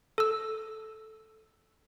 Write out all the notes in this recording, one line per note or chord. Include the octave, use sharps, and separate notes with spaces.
A4 E6